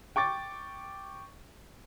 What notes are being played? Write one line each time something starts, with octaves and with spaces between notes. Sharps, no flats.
G5 C#6 D6 A6